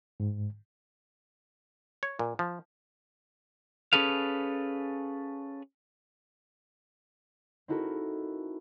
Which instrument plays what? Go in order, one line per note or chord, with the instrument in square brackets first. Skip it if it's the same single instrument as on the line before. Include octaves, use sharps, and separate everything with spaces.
[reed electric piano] G#2
[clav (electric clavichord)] C#5
A#2
F3
[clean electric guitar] C#4 G#4 A4 B4 F5
[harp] C4 D#4 E4 F#4 A4 A#4